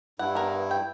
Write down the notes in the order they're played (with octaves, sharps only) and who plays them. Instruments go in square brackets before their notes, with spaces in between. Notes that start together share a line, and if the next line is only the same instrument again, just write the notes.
[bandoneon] G2 E4 [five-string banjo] F#5
[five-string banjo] B3 A#4
G5